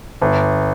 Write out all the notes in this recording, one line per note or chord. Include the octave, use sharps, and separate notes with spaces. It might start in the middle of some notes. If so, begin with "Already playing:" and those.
G1